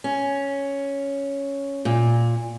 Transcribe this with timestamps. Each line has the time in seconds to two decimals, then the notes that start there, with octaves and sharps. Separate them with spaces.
0.04 C#4
1.85 A#2